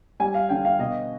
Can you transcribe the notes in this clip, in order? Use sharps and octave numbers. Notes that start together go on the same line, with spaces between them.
G3 G#5
F5
D3 G5
F5
B2 D#5